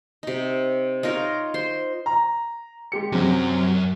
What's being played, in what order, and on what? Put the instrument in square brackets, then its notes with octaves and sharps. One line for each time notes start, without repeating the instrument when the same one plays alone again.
[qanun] C3 D#4
D#4 F4 A#4 C#5
C5 C6
[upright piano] A#5
G#3 G4 C#7
[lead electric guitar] F#2 [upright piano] C3 F#3